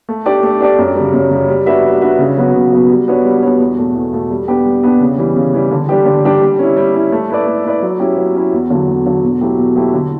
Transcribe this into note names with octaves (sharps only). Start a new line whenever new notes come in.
A3
D4 G4 D5
A3
D4 G4 D5
F#2
C#3 G3
F#2
C#3 G3
G3
D4 F#4 B4 E5
G3
D4 F#4 B4 E5
C#3
F#3 B3 F#4
C#3
F#3 B3 F#4
G3
B3 D4 F#4 C#5
G3
B3 D4 F#4 C#5
E2
B2 A3
E2
B2 A3
G3
B3 D4 G4
G3
B3 D4 G4
C#3
E3 G3
C#3
E3 G3
D3
G3 D4 G4
D3
G3 D4 G4
G3
C#4 E4
G3
C#4 E4
A3
E4 B4 D5
A3
E4 B4 D5
F#3
C#4 E4 G4
F#3
C#4 E4 G4
E2
D3 F#3
E2
D3 F#3
B2
F#3 A3 E4 G4
B2
F#3 A3 E4 G4
D3